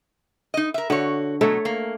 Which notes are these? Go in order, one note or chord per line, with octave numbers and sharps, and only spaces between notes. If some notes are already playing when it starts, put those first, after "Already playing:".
D#4 D#5
A#4 E5
D3 F#4 C#5
B2 F#3 A3 A4 C#5
A#3